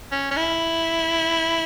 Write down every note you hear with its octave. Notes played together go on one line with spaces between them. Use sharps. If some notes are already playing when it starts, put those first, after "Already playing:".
C#4
C#4
E4